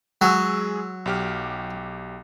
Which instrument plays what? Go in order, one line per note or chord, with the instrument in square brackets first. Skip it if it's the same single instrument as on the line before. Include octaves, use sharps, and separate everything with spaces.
[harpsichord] F#3 [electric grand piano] G#3 G#4 E6
[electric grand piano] B1 G4 F6